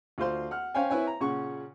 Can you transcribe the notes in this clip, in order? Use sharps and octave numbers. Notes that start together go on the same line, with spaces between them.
D2 F4 C5 C6
F#5 F6
C#4 C5 C#5 F5 G5 G#5
C4 E4 B4 C#5 G#5
A#5
A#2 C#3 C#4 F#5 C#6